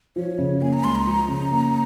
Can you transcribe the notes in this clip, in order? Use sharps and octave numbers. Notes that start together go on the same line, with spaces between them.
F3 C#5
C#3
A#3 G#5
A#5
C#2 C6
A#5
F3
C#3
A#3